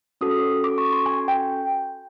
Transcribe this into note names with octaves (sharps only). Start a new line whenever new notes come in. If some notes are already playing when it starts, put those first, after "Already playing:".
C#4 F#4 A4 D#6
D6
C#6
C6
G#5
G5